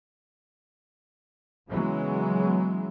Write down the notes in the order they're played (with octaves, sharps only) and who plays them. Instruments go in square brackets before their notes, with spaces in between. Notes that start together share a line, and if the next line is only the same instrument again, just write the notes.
[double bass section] C#3 E3 F#3 G#3 B3